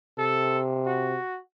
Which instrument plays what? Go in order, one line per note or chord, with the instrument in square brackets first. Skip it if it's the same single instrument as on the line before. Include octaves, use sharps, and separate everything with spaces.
[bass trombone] C3 [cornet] A4
[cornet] F#4